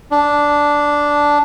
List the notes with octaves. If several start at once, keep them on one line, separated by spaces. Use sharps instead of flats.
D4